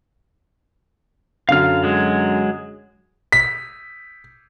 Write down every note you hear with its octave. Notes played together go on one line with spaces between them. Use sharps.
F#2 D3 F5 F6
F#3 G#3
B6